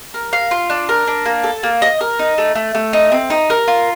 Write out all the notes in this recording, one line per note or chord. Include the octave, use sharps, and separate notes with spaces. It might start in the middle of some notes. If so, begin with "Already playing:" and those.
A#4
F5
F4
D4
A#4
D4
A#3
A4
A#3
D#5
A#4
D#4
A3
A3
A3
D#4
C4
D#4
A#4
F4